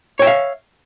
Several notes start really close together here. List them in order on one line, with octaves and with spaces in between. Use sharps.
C#5 G5 E5 F5